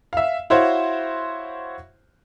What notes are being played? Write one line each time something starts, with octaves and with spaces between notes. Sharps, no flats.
E5 F5
E4 F#4 C5 C#5 F5